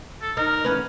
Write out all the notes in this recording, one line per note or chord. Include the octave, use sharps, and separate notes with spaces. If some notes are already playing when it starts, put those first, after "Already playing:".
A4
D#4 A#4
E2 C#4 B4